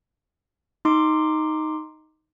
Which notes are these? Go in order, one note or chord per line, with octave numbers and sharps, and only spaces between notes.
D#4 C6 D6